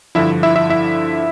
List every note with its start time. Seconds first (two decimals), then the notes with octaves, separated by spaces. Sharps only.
0.15 G2 D3 F3 E4 E5
0.43 E4 E5
0.56 E4 E5
0.70 E4 E5